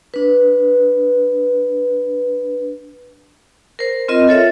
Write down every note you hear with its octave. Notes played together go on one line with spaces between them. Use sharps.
D4 B4
A#4 C5
C4 F4 A#4 D#5
F4 A4 C#5 E5